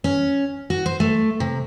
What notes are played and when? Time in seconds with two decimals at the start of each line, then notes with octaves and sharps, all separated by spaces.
0.04 C#4
0.70 F#4
0.86 C5
1.00 A3
1.40 C3